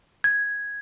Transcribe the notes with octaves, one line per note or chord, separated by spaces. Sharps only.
G#6